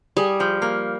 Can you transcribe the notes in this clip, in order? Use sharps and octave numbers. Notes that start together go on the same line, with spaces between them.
G3 G#4
F3
A#3